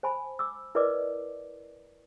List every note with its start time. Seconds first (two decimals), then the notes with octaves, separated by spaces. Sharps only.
0.03 C5 G#5 A5 B5
0.39 D6 E6
0.75 E4 A#4 B4 D5 D#5 D6